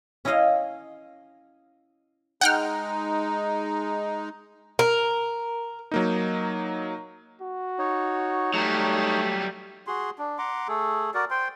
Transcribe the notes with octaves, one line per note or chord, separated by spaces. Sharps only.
C#4 E4 C#5 D#5 F5
G#3 D#4 F#5 G5 F6
A#4
F#3 A#3 D#4
F#4
D#4 C#5
F#3 G3 A3
F#4 G#4 C6
D4
F#5 A#5 C6 D6
A3 G#4 A4
F#4 A#4 D5
C5 G5 C6